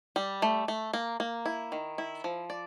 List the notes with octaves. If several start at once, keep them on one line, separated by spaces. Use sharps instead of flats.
G3
A3
A3
A#3
A#3
E4
D#3
E4
F3
D5